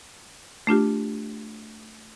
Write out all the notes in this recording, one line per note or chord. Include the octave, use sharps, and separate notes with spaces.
A3 D4 F4 G4